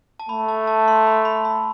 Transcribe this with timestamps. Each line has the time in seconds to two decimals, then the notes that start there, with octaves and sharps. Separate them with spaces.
0.20 A5
0.29 A3 B5
0.48 A5
0.67 A5
0.88 C6
1.07 B5
1.25 B5
1.45 B5